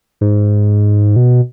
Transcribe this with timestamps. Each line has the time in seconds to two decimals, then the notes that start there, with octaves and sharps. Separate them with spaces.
0.21 G#2
1.16 B2